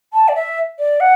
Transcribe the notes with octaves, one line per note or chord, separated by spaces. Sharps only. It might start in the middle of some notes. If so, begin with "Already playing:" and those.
A5
D5
E5
D5
F#5